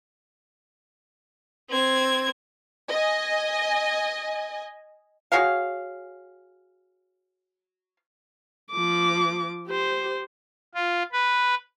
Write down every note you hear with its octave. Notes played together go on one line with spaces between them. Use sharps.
C4 G#6
D#5 G#5
F#4 G#4 C#5 F5
F3 D6
G4 C5
F4
B4